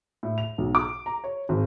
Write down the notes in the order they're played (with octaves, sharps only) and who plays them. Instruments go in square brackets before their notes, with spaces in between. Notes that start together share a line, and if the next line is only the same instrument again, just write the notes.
[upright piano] A2
F7
B1
D6
A#5
C#5
G#1